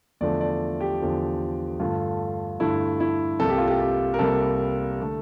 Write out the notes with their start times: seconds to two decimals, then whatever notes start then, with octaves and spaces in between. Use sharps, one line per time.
0.21 E2 D3 F3 A3 D5
0.41 D5
0.81 G4
1.00 E2 D3 F3 A3
1.80 G2 D3 A3 F4
2.60 G2 D3 A3 E4
3.00 E4
3.39 C2 C3 G3 A#3 A4
3.49 G4
3.58 F4
3.67 G4
3.80 G4
4.14 A#4
4.19 C2 C3 G3 A#3 A4
5.01 D3 A3